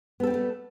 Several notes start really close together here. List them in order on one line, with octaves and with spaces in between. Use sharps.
B3 A4 C4 G3 A3